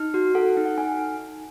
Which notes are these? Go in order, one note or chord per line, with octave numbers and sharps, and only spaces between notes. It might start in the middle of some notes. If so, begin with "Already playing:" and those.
Already playing: D#4
F#4
A4 F#5
D#4
F#5
D#4 G#5